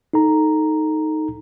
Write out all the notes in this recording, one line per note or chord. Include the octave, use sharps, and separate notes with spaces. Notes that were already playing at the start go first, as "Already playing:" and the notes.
D#4 A4 A#5